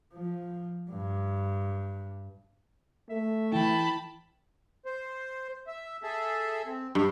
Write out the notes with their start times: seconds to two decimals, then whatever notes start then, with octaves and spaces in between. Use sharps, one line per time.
0.14 F3
0.91 G2
3.09 A3 E5
3.53 E3 E4 G5 A5 B5
4.85 C5
5.67 E5
6.03 G#4 A4 E5
6.67 C4
6.95 G2 G5